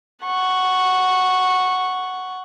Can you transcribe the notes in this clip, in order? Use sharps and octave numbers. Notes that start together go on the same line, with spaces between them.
F#5 C#6